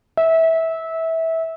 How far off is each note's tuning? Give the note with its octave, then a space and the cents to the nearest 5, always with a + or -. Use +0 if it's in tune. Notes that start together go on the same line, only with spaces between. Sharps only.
E5 -20